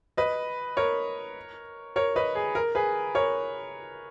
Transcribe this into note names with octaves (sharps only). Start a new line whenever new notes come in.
B4 D#5
A#4 C#5
A#4 C#5
B4 D#5
G#4
A#4
G#4 B4
A#4 C#5